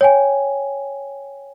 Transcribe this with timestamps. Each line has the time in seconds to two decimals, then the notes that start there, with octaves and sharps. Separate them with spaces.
0.01 C#5 G5 G#5